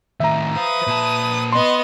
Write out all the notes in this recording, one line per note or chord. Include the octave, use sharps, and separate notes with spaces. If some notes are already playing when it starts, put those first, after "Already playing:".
A2 D#3 E5 A#5
B4 C5 F5 D#6
A#2 A5
B3 D#5 C6